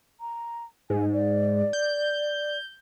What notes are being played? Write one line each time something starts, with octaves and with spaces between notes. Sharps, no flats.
A#5
G#2 G#5
D5
G6